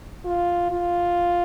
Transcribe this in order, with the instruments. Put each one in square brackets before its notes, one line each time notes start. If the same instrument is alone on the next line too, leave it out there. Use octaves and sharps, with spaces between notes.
[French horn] F4
F4